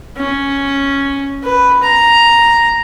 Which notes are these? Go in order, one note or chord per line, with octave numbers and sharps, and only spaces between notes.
C#4
B4
A#5